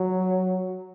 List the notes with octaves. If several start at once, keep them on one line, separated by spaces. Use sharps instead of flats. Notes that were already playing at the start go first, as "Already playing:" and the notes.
Already playing: F#3